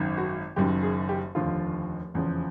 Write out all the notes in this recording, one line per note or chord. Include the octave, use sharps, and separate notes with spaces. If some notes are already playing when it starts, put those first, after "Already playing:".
Already playing: G#1 F#2 D#3
F#4
F#1 F#2 D#3 G4
G#4
G4
F1 D#2 D3 F3 F4
F1 E2 C#3 F3